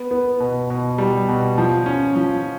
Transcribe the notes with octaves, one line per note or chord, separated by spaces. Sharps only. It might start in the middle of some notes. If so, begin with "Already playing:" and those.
Already playing: B3
B3
B2
B2
G3
B2
F3
C#4
F3